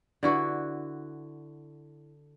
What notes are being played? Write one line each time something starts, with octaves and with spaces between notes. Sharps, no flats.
D3 E4 F#4 B4